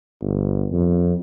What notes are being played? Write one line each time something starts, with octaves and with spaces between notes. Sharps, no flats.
G1
F2